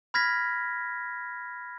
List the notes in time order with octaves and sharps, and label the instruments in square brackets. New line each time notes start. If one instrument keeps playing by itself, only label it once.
[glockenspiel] B5 F6 G#6 A#6 B6